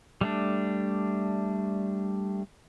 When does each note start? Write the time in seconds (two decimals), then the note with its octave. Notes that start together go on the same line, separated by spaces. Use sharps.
0.21 G3 A3 D4